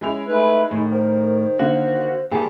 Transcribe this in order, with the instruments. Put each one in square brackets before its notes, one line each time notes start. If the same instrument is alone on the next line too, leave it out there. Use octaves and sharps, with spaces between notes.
[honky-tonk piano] G#3 E4 F7 [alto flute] C#4
[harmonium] A3 B4 [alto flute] D#4
[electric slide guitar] A2 [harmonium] D#3
[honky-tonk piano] A#4 [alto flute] C5
[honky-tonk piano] D3 A#3 F5 [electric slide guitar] F#4
[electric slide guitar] A#2 D#3 G3 [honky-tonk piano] G#4 A5 [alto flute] G5